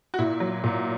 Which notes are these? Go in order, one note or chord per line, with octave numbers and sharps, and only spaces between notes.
F#4
A#2 E4
F#3
A#2